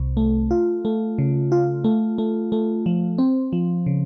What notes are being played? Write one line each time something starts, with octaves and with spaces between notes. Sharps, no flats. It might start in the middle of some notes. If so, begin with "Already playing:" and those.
Already playing: C2 C3
A3
F4
A3
C#3
F4
A3
A3
A3
F3
C4
F3
C#3